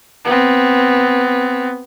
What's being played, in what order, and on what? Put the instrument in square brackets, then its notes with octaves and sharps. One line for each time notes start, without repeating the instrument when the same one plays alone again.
[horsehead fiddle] B3 C4